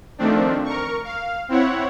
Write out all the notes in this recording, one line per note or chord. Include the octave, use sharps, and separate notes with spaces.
D#3 F3 A3 C4 D4
A#4 C#6
F5
C4 E4 C#5 F#5